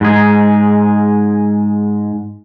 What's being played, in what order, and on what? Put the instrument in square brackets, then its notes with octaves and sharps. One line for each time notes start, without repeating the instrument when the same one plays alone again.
[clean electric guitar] G#2 G#3 G#4